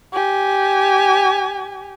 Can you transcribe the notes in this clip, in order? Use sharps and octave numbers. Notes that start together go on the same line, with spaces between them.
G4 G#5